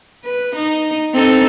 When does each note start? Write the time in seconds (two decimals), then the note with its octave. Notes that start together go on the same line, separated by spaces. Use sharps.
0.25 B4
0.56 D#4
1.14 C4 D#4 A4